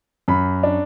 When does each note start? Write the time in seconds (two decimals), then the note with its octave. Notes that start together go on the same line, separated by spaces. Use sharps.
0.28 F#2 B5
0.63 D4